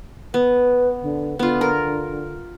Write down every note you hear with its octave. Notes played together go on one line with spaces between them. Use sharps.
B3 B4
D3
D3 B3 F4
A#4